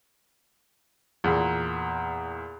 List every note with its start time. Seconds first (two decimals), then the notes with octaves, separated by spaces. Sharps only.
1.24 E2 A#2